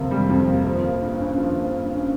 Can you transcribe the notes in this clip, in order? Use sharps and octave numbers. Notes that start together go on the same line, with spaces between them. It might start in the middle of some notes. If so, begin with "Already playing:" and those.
Already playing: F2 C3 A#3
G3
F2
A#3
F3
A#3
G2
C#4
F3
A#3
G2
C#4